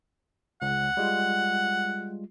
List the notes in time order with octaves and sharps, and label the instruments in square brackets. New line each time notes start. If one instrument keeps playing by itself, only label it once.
[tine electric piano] C#2 [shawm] F#5
[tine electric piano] G3 G#3 F4